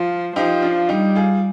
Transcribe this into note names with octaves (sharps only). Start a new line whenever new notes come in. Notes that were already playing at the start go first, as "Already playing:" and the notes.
Already playing: F3 F4
F3 D#4 G4
D4 F4
G3 D#4 G4
F4 G#4